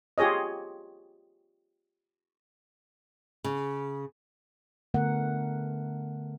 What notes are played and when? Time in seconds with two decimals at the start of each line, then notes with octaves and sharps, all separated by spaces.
0.18 F4 G4 G#4 C#5 D#5
3.44 C#3
4.94 D3 A3 B3 A#4 F#5